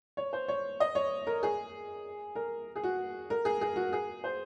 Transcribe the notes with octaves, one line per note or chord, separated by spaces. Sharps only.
C#5
C5
C#5
D#5
C#5
A#4
G#4
A#4
G#4
F#4
A#4
G#4
G#4
F#4
G#4
C5